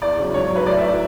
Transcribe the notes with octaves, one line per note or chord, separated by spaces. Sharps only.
E2 D5
C#3 F#3
G#2 C#5
F#3
B4
A2 D5
E5
F#3 D5